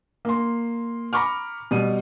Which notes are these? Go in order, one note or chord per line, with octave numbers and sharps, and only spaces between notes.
A#3 C6
A#5 B5 C#6 D6 F6
B2 G3 D#7